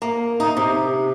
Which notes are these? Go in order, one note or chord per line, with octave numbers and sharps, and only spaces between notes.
A#3
D#4
C3